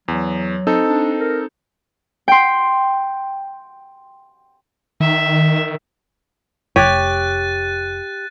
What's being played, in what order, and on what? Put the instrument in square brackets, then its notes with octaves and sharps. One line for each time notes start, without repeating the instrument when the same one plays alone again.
[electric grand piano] E2 [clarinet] F#3
[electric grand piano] C4 D#4 A4
[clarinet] D4
A#4
[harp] G5 C6
[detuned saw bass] D#3 [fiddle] E5
[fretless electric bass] F1 [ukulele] G4 [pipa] C#5 [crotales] F#6 A6 D#7